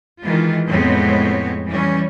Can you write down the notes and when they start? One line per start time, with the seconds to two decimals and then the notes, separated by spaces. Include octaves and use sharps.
0.21 D#3 E3 G#3 F4
0.67 F2 A2 G#3 B3 C4 C#5
1.66 E3 G3 C#4